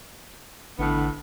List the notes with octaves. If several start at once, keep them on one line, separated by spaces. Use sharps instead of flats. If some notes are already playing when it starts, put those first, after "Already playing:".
A1 A2 D3 B3